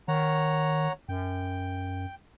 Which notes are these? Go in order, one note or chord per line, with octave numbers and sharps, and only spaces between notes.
D#3 C#5 F#5 A#5
F#2 G5